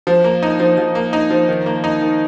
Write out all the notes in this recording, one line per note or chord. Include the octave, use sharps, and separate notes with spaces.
F3
A#3
D#4
F3
F3
A#3
D#4
F3
D#3
A#3
D#4
D#3